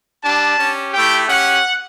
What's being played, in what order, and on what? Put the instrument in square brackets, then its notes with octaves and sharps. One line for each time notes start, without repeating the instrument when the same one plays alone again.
[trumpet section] G3 D4 G4 A5
C#4 G4
A3 E4 G4 G5
C#4 G4 F#5